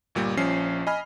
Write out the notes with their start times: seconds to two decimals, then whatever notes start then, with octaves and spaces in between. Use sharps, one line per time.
0.15 G1 A#2 G3 G4
0.37 A#1 F3 C#4 C7
0.87 D#5 G#5 B5 F6